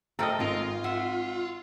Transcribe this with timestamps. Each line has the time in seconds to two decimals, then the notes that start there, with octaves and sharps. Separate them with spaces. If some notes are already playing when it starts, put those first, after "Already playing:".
0.19 A3 A4 A#4 C5 D#5 G5 A#5
0.40 G#1 G#3 F4
0.84 E5 F#5